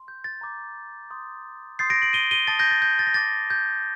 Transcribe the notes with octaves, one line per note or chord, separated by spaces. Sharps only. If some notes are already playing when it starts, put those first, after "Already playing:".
Already playing: C6
G6
A6
A#5 D6 G6
C6 D#6 G6
C6 D#6 G6 A6 C7
A#6 D7
D7 F#7
D#7 G7
D#7 G7
A5 D#6 G6 A6
G6 A#6
A6
G6
A6
A#6
A5 D6 G6 A6
G6